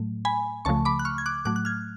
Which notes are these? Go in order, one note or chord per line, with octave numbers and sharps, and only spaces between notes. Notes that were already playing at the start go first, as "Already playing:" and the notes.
Already playing: A2 F#3 A3
G#5 B5
C#2 C#3 F3 A3 A5 C#6
B5 D6
F#6
C#6 F6
G#6
D6 F#6
A2 F#3 A3 D6 F#6
F#6
F6 G#6